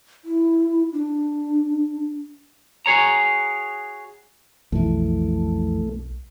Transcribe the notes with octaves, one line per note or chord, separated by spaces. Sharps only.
E4
D4
F#4 G#4 C#5 A#5
B1 F2 E3 A3